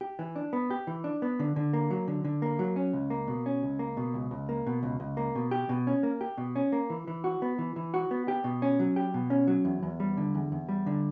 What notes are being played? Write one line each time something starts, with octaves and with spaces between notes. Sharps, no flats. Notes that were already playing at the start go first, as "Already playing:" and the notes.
G4
E3
D4
B3
G4
E3
D4
B3
D3
D3
A#3
F#3
D3
D3
A#3
F#3
C#4
C#2
A#3
B2
C#4
C#2
A#3
B2
C#2
C#2
A#3
B2
C#2
C#2
A#3
B2
G4
B2
C#4
A#3
G4
B2
C#4
A#3
E3
E3
F#4
B3
E3
E3
F#4
B3
G4
B2
C#4
F#3
G4
B2
C#4
F#3
E2
E2
G3
D3
E2
E2
G3
D3